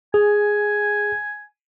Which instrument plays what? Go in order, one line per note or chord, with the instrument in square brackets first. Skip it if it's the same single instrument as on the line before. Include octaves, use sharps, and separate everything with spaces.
[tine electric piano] G#4 [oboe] G#5